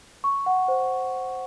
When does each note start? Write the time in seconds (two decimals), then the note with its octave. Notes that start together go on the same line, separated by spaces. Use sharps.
0.24 C#6
0.46 F#5
0.68 C5